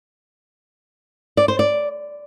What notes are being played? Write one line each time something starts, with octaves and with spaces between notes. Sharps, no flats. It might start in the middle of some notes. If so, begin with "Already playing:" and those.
D5
C5
D5